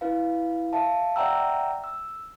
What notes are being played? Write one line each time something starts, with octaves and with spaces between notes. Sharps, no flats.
E4 B4 F5
E5 F5 A5
D5 E5 F#5 G5 A#5 E6
E6